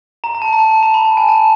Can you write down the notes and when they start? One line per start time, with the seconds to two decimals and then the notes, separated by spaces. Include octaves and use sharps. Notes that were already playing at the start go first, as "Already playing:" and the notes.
0.24 A#5
0.35 A#5
0.42 A5
0.53 A#5
0.59 A5
0.71 A5
0.83 A#5
0.94 B5
1.05 A5
1.17 G#5
1.29 A5